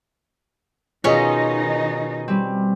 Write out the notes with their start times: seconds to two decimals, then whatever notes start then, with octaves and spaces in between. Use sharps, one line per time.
1.04 B2 D#3 C#4 D#4 F4 G#4 D#5
2.28 G3 C4